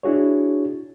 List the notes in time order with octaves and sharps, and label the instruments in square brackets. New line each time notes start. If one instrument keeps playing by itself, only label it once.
[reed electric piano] D4 E4 F#4 G#4 C#5